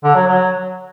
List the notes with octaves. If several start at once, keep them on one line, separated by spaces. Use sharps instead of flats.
D3
F#3
F#3